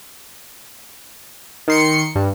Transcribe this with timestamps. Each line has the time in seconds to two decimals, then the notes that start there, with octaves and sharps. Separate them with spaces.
1.68 D#3 C6 C#7
2.15 G2